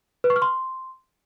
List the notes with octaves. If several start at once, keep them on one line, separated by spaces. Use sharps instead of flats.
B4
C#6
F6
C6